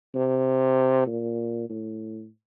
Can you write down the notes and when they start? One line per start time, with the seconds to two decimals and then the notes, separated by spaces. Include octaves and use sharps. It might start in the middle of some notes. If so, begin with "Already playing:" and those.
0.15 C3
1.07 A#2
1.70 A2